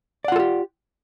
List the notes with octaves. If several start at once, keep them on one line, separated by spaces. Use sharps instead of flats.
F4 G4 A4 D5 F#5